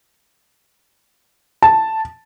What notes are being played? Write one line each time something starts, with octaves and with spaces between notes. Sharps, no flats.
A5